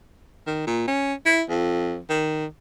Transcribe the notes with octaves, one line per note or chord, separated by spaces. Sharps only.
D#3
A#2
C#4
E4
F2
D#3